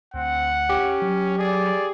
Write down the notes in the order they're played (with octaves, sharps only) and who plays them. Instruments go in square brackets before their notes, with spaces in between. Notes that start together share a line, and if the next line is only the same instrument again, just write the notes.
[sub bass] D2 [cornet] C4 [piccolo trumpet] F#5
[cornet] C#4 [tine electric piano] G4
[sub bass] F#3
[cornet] G#4 [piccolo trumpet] D5